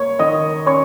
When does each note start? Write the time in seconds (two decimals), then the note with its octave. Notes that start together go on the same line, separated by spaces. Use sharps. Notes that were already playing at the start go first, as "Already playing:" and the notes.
Already playing: A#3 C#5 C#6
0.19 D#3 D#5 D#6
0.66 C#4 C#5 C#6